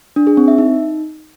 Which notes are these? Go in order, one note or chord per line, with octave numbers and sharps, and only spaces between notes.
D4
G#4
C4
E5
D#4